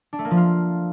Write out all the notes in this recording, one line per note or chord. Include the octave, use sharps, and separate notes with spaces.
D4
A3
A#3
F3
F4